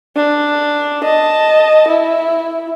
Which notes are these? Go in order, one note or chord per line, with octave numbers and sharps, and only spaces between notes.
D4
D#5 A5
E4